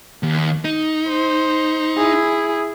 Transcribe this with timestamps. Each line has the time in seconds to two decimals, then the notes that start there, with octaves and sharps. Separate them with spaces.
0.23 D#2
0.64 D#4
1.09 C5
1.97 E4 G#4